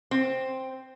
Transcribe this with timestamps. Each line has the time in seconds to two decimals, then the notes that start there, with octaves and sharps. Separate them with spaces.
0.11 C4